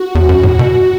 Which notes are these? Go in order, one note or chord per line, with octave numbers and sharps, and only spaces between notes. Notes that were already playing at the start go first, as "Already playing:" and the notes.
Already playing: F#4
E2
F#2
A2 F#4
B2